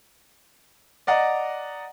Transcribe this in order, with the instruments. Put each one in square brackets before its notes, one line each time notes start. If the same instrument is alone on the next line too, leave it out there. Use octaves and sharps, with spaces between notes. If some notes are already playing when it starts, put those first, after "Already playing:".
[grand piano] D5 D#5 F#5 A#5